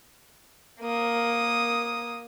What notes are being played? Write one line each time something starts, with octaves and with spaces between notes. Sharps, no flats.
A#3 D#6